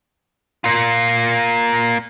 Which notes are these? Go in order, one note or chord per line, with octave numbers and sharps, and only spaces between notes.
A#3 F4